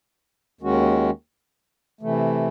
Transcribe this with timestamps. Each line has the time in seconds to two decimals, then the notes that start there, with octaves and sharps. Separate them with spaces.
0.61 D#2 D#3 G#3 C#4 F#4
2.01 C3 E3 A3